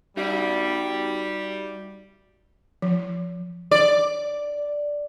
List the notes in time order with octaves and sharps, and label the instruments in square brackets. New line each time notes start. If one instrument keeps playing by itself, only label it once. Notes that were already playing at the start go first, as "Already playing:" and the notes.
[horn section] G3 [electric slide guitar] D#4 F#4 E5
[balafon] F3
[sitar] D5